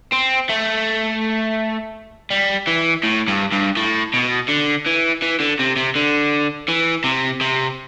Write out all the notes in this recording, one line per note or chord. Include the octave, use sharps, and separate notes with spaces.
C4
A3
G3
E3
A2
G2
G2
A2
B2
D3
E3
E3
D3
C3
C3
D3
E3
C3
C3